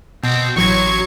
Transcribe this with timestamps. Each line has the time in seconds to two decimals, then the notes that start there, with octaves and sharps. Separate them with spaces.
0.23 B2 C4
0.56 A1 F#3 C#6 G#6